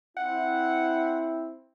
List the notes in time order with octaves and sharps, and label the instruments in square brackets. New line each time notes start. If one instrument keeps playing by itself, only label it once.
[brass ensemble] C4 E4 [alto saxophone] F#5